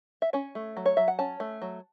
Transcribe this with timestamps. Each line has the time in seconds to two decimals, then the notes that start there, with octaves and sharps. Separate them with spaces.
0.22 E5
0.33 C#4 C#5
0.55 A3
0.77 F#3
0.86 C#5
0.97 F#3 E5
1.08 F#5
1.19 C#4 A5
1.40 A3
1.62 F#3